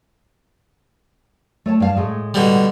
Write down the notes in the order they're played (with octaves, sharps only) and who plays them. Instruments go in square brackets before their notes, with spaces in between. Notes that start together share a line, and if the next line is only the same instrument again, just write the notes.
[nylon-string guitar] A3 C#5 A5
G2 F5 A5
A2 G#3 A3
[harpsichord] B2 D3 G3